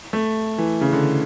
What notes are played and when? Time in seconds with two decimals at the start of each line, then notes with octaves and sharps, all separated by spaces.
0.13 A3
0.58 E3
0.81 C#3
0.93 D3